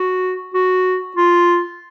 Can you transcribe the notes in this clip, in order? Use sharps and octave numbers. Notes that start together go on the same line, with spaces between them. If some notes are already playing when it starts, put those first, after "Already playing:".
Already playing: F#4
F#4
F4